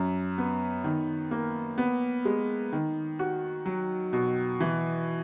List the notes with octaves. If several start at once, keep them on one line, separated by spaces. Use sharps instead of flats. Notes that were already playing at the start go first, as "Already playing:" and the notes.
Already playing: F#2
B3
D#3
A#3
B3
G#3
D#3
F#4
F#3
B2
E3